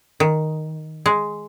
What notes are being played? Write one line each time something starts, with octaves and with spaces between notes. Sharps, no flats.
D#3
G#3